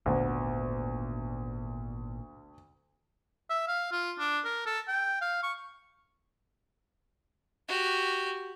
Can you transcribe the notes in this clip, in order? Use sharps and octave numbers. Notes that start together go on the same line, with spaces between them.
G#1 D2 A#2 B3
E5
F5
F4
D4
A#4
A4
G5
F5
C#6
F#4 G4